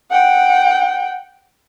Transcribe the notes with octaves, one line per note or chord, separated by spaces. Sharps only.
F#5 G5